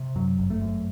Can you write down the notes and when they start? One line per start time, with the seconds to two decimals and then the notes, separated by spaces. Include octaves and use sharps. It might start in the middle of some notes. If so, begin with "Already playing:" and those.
Already playing: C3
0.15 F#2 F#3
0.38 G1
0.50 A3
0.61 F#2